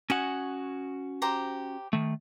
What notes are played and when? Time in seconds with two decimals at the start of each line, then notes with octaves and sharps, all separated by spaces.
0.10 C#4 F#4 D#5 F#5 G#5
1.22 G4 C5 A#5
1.93 D#3 A3